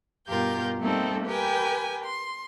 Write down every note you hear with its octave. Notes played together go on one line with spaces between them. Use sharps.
G2 B2 F4 G4 A#4 G6
G3 A3 A#3 C4 D#4 A4
G4 A#4 B4 G5 G#5
C6